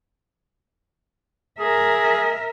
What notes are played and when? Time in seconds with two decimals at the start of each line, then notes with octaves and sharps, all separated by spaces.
1.60 G#4 A#4 E5